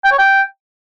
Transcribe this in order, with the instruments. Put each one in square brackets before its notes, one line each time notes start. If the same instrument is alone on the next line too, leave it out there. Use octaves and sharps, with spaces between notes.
[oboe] G5
C#5
G5